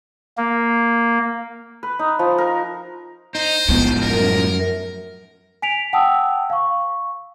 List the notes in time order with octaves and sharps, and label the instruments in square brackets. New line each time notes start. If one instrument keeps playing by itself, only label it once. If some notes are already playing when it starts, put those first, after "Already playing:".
[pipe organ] A#3
[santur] B4
D#4
F3
A#4
[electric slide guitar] D#4 [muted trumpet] C5
[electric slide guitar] A2 F3 G#3 [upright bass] B3
[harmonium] F#2 [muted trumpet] A#4
[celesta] G#5 B6 D7 F7
F#5 G5 A5 D#6 E6
F5 C#6